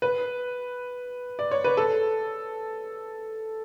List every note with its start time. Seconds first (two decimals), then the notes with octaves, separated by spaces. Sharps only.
0.02 B4
1.39 D5
1.51 C#5
1.64 B4
1.77 A4